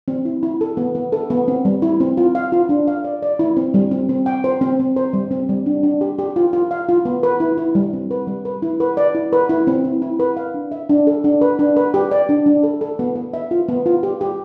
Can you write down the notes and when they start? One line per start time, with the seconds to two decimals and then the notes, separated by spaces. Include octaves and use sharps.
0.08 C4
0.25 E4
0.43 E4
0.61 A4
0.77 B3
0.95 B3
1.12 A4
1.30 B3
1.48 C4
1.65 G3
1.82 E4
2.00 C4
2.17 F4
2.35 F5
2.52 F4
2.69 D4
2.88 F5
3.04 D5
3.22 D5
3.39 E4
3.57 C4
3.74 G3
3.91 C4
4.09 C4
4.26 G5
4.44 C5
4.61 C4
4.79 C4
4.96 C5
5.13 G3
5.31 C4
5.49 G3
5.66 D4
5.83 D4
6.01 G4
6.19 G4
6.36 F4
6.53 F4
6.71 F5
6.88 F4
7.05 B3
7.23 B4
7.40 E4
7.58 E4
7.75 G3
7.93 C4
8.11 B4
8.27 G3
8.45 B4
8.62 E4
8.80 B4
8.97 D5
9.15 E4
9.33 B4
9.49 E4
9.67 C4
9.84 E4
10.02 E4
10.19 B4
10.37 F5
10.54 D4
10.72 E5
10.89 D4
11.07 A4
11.24 D4
11.41 B4
11.59 D4
11.77 B4
11.94 G4
12.11 D5
12.29 D4
12.46 D4
12.63 A4
12.81 A4
12.99 B3
13.16 B3
13.34 E5
13.51 F4
13.68 B3
13.86 F4
14.03 G4
14.21 G4